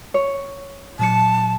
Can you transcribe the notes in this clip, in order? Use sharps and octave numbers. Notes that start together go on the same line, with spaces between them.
C#5
A#2 F#3 A5 C#7